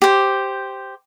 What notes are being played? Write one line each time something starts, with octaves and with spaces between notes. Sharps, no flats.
G4 C5